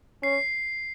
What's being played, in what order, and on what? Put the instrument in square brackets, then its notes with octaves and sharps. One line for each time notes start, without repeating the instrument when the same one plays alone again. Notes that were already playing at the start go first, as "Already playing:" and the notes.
[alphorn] C#4 [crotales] C7